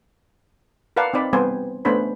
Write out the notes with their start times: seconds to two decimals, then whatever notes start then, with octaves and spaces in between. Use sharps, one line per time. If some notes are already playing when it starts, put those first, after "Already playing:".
0.97 A#4 B4 D5 F5 F#5 A5
1.14 C4 D#4 D5 B5
1.33 G3 B3 C4 C5 G#5
1.85 A3 B3 C#4 D4 C5 B5